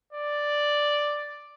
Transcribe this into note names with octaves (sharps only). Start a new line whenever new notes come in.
D5